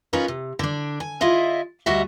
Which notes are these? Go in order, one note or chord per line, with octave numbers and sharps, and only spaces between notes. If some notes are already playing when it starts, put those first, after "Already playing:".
C#4 D#4 F4 A#4 B4
C3
D3 D4
G#5
E4 F4 G#4 D#5 E5
D2 G3 F#4 D#5 E5